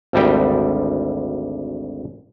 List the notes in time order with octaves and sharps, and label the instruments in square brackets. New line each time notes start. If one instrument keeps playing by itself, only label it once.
[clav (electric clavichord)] G#1 D2 G3 G5